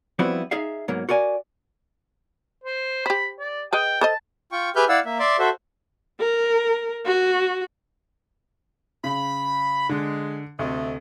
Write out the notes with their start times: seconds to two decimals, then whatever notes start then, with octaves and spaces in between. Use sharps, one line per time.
0.19 F3 G3 B3 C4 E4 F#4
0.51 D#4 G#4 E5 F5
0.88 G#2 B2 F#3 A#3
1.09 F#4 A#4 D5 G#5
2.64 C5
3.06 G4 C5 B5
3.39 D5
3.73 G#4 B4 D#5 G5
4.01 A4 C5 D#5 A5
4.52 F4 G5 C#6
4.76 G4 G#4 B4 E5 F6 G6
4.89 E4 D5 F5 F#5 E6
5.05 A#3 E5
5.19 D5 E5 C6 D6
5.39 F#4 A4 C5 E5
6.20 A#4
7.06 F#4
9.04 C#3 B5
9.89 D3 G#3
10.59 D2 C3 A3 D#5